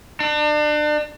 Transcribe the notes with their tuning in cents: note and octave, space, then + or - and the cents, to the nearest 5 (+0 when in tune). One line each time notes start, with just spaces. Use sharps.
D4 +35